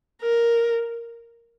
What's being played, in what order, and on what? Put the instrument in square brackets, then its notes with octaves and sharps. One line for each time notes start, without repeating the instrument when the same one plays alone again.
[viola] A#4